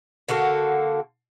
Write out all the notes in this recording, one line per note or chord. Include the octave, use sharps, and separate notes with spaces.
D3 A#3 F#4 A4